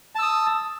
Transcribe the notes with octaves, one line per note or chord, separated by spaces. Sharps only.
A5 D#6 E6